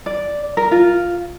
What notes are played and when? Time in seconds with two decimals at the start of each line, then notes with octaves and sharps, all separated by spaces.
0.06 D5
0.57 A#4
0.71 F4